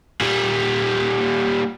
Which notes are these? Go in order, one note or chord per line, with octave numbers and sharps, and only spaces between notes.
A#2 G3